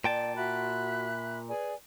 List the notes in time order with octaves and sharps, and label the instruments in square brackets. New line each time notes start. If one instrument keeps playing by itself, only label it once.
[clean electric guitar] A#2 G5 A5 [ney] D5
[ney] F#4 [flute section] E5 B5 F#6
[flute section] G#4 D5 G#5 [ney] B4